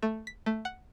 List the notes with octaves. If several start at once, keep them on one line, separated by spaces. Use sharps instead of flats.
A3
B6
A3
F#5